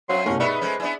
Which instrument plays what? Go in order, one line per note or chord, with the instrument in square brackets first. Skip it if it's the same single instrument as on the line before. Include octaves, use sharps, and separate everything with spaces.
[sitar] F#2 C4 [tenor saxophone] F#3 [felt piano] F5 [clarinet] C6
[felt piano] C2 B2 A3 [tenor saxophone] C#4 [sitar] A#4
[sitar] B3 D#4 E5 [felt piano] G#4 D5 [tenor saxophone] B4 [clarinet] C#6
[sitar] G#3 A3 C#4 [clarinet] C5
[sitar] B3 D4 E4 [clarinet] G#5